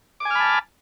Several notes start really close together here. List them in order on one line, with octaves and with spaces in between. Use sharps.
D6 G#5 F6 B5 A5